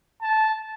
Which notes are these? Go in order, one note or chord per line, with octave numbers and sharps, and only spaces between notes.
A5